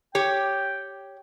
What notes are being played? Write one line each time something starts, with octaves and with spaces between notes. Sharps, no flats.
G4 C#5 G5